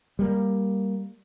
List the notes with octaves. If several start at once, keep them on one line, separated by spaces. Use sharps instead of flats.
G3 A#3